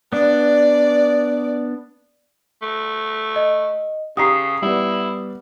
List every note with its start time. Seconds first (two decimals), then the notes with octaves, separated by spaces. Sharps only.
0.13 B3 D4 D5
2.62 A3
3.36 D#5
4.17 C#3 G4 A#5 D#6 C7
4.62 G3 B3 E4